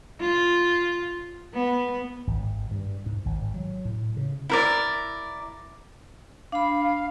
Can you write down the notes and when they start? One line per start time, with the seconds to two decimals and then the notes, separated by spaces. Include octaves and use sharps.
0.20 F4
1.54 B3
2.27 G#1
2.71 G2
3.06 G#2
3.26 G#1
3.54 F#3
3.85 A2
4.17 C#3
4.50 E4 A#4 D5
6.52 D4 F5 B5